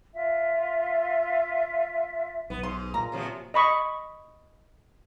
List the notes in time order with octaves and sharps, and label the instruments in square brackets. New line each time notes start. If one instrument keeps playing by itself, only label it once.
[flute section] F4 E5
[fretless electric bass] B1 [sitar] B3
[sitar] G#2 [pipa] C6
[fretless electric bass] A#2 [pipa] A#5
[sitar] C3 F3 F#3
[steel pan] D#5 B5 C#6